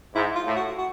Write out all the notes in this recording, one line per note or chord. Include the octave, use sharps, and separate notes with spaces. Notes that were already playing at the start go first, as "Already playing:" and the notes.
G#2 E4
F4
A2
F#4
F#4